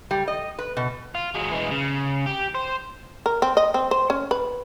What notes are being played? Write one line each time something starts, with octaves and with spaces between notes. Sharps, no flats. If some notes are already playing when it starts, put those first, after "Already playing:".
G3
D#5
B4
B2
F4
F#3 G#3
E3 G#3
C#3
G4
C5
A#4
C4
D#5
C4
C5
C#4
B4